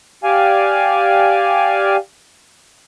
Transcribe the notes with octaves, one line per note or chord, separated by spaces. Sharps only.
G4 D5 F5 G#5